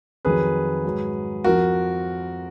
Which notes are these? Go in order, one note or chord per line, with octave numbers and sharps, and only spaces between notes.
F2 D#3 F#3 G#4 B4
G#2 F#3
F2 F3 F#4 A#4